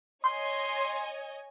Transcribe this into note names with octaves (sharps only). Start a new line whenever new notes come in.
C#5 D#5 G#5 C6